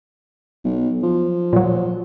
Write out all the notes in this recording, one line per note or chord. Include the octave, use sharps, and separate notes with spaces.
B1
F3
A#2 F#3